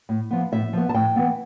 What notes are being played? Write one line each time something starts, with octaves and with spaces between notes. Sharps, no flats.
A2
F3 B3
A2 E5
F3 B3
A5
A2 G5
E3 B3